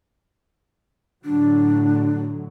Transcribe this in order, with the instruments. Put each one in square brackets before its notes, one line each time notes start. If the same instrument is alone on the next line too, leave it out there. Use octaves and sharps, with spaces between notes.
[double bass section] A2 D3 F#3 [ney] D4